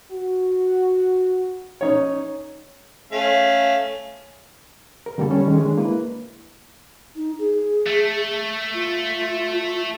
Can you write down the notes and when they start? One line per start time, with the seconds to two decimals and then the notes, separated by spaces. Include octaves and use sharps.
0.11 F#4
1.81 C#4 D#4 C#5
3.12 A3 C#4 F5
5.06 A#4
5.18 D3 G3 A#3 A4
5.30 G3 C#4 A4
5.47 D#3 G#3 C#4
5.60 G#3 D4
5.78 A#3 E4 B4
7.15 D#4
7.39 G#4
7.87 A3
8.74 F4